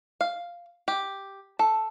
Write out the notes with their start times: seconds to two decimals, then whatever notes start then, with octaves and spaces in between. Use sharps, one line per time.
0.21 F5
0.88 G4
1.59 A4